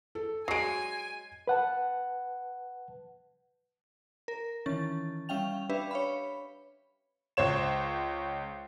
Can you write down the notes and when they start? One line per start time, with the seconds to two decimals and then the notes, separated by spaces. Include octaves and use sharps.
0.15 A4
0.48 F#3 G#3 G#5 C7 D7
1.47 B4 F#5 A5
4.28 A#4
4.66 D#3 E3 C#4 A6
5.29 G3 C#4 E5 F5 G5 F7
5.69 D4 G4 B4 E5
5.91 C#5 F5 B5
7.37 C#2 C5 C#5 E7